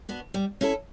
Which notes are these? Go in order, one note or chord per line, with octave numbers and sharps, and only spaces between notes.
B3 D4 F#4
G3
C#4 E4 A4